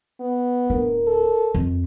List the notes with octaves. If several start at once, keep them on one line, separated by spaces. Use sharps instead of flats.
B3
D1 D4 A#4
A4
F2